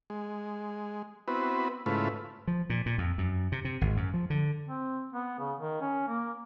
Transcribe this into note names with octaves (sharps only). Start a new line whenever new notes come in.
G#3
B3 C4 E4 F#4 B4
G#2 C#3 A3 E4 F4 B4
F3
A#2
A#2
F2
F#2
C3
C3
G#1
F#2
F3
D3
C4
B3
C#3
D#3
C#4
A#3